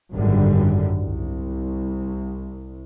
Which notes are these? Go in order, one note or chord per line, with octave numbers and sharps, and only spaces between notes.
G#1 F#2 D3 G3
C2